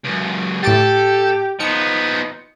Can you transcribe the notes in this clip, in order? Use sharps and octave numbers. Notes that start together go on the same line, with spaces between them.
C#2 F#2
A2 G4 A4 D6 A6
F3 B3 D#4 C#7